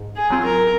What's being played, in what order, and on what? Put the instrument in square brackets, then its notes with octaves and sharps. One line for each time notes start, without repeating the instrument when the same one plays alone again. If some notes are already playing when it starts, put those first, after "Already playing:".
Already playing: [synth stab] G#2
[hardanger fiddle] G#4
[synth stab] F#3 C4 F4
[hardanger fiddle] A#4